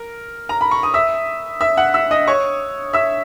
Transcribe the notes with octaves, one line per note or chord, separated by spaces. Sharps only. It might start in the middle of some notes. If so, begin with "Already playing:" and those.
Already playing: A#4
A#5
B5
C#6
D#6
E5 E6
E5 E6
F#5 F#6
E5 E6
D#5 D#6
C#5 C#6
E5 E6